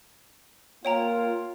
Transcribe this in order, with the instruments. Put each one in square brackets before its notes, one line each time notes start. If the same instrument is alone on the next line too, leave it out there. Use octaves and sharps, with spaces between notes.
[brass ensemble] A#3 F4 [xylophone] C#5 G5 A#5